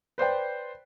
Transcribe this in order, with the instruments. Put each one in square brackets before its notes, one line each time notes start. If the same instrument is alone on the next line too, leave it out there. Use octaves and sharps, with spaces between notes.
[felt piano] B4 C5 D5 G5